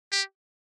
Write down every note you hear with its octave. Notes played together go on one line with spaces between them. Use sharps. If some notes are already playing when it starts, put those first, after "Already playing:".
G4